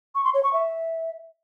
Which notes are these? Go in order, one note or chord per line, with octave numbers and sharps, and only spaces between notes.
C#6
C6
C#5
C#6
E5